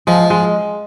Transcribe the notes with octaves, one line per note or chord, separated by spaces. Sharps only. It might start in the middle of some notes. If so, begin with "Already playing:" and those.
F3 G#3
G#3